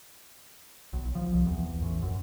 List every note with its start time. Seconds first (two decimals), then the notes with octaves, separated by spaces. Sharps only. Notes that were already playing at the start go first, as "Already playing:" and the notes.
0.93 B1
1.15 F3
1.32 C2
1.47 E2
1.82 A1
2.02 F#2